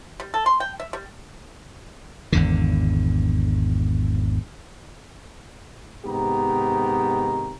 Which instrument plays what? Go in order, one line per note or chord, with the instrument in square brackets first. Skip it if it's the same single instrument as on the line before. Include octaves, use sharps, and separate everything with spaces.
[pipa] G3
A4
C6
G5
E5
G3
[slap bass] G#1 E2 D3
[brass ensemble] G#2 C3 D#3 B3 G4 A#5